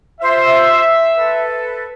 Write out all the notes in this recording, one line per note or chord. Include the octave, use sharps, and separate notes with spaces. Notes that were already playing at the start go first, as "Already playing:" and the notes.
F4 C5 E5
A4 B4